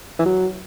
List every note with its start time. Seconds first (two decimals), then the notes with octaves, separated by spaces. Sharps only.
0.19 E3
0.26 F#3